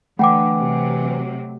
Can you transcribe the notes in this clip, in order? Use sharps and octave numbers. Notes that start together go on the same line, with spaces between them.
D3 E3 A3 F#5 G5 D6
C3 F#3